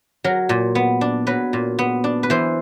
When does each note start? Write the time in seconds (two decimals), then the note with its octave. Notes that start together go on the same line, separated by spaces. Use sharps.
0.24 F#3 A#4
0.49 A#2
0.75 B3
1.01 D4
1.27 F#3 B4
1.53 A#2
1.79 B3
2.04 D4
2.23 B4
2.30 E3 C5